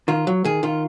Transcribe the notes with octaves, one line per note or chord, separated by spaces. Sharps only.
D#3 F4
F#3
D#3 G#4
D#3 F4